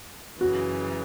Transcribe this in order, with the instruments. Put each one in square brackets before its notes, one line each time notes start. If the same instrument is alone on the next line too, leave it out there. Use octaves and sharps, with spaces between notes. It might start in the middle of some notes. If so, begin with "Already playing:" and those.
[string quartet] F#2 C#3 E3 [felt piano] F#4